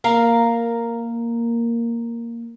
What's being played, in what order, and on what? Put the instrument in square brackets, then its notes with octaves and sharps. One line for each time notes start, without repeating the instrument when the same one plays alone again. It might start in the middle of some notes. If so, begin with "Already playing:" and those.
[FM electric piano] A#3 [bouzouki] A#4 F5 A#5